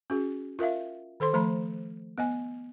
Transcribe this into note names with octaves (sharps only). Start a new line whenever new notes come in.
C#4 F#4 G#4
F4 A#4 E5 F5
D#3 A4 C5 C6
F3 A3 A#5 B5
B3 D#5 G#5